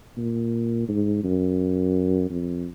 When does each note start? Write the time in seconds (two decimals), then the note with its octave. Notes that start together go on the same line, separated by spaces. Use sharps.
0.17 A#2
0.88 G#2
1.24 F#2
2.30 F2